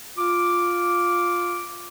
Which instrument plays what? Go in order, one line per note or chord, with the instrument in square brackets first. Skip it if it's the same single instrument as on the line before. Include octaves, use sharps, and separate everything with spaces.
[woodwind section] F4 D6